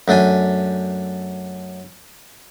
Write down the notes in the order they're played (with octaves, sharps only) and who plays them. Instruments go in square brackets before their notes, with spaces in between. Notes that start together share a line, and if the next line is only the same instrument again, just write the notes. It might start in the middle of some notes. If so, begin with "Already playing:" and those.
[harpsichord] F#2 A3 D4 G#5